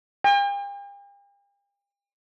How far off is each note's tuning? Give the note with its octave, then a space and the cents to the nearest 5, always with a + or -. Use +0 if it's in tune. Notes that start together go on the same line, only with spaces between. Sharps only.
G5 +45